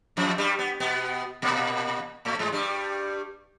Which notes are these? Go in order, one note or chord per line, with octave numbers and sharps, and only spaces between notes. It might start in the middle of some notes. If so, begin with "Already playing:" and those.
F2 F3
G2 G3
B3
B2 B3
A#2 A#3
A2 A3
G#2 G#3
G2 G3